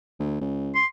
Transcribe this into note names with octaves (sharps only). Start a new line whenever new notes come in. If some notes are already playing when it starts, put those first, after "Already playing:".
D2
C#2
C6